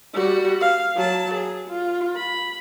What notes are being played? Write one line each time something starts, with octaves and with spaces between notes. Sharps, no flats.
G3 F#4
F5
F#3 A5
G#4
F4
B5